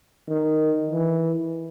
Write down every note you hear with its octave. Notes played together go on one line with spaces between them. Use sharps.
D#3
E3